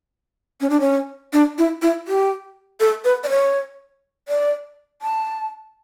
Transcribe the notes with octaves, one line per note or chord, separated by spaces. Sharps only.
C#4
D4
C#4
D4
E4
E4
G4
A4
B4
D5
C#5
D5
A5